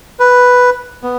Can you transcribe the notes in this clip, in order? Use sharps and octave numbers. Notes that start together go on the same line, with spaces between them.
B4
B3